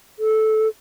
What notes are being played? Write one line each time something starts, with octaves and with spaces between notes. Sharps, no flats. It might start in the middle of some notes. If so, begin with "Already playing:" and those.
A4